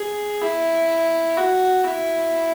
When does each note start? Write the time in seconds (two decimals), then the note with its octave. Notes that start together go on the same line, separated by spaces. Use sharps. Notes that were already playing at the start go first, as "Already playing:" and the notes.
Already playing: G#4
0.41 E4
1.37 F#4
1.84 E4